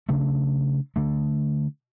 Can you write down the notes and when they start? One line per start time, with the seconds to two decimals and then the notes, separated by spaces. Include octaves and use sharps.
0.09 C#3 F#3 A3 D4
0.96 D3 A3 D4